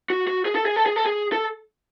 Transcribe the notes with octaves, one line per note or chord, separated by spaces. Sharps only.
F#4
F#4
G#4
A4
G#4
A4
G#4
A4
G#4
A4